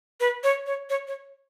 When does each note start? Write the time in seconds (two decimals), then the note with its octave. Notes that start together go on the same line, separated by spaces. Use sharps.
0.20 B4
0.44 C#5
0.66 C#5
0.90 C#5
1.08 C#5